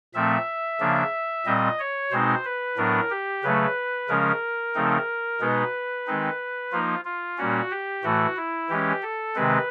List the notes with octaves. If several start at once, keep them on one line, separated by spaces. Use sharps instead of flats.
A#2 F3 A3 C4 E5
C#3 F3 A#3 D4
A#2 G3 C4 D#5
C#5
B2 G#3 C4 D#4 C5
B4
A2 F#3 B3 D4 A#4
G4
C#3 F#3 A3 B4
C#3 F3 G#3 C#4 A#4
C#3 F3 A3 C4 D#4
B2 G#3 B3 D#4 B4
D#3 G#3 C4 D#4
F3 A#3 D#4 F4
F4
A#2 G3 A#3 C#4 F#4
G4
A2 E3 A3 F#4
E4
E3 G#3 C#4 G4
A4
C3 D#3 G#3 C4 B4